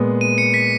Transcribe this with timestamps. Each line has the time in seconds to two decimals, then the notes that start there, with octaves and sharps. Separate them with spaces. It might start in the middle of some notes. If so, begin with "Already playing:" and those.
Already playing: A#2 G#3 B3
0.21 D#7
0.38 C#7
0.54 B6